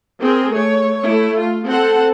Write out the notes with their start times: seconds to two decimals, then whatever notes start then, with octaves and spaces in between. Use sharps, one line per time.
0.22 C4 G#4 A#4
0.53 A3 C#5
1.02 A3 E4
1.39 F4
1.68 C4 A4 C5 F#5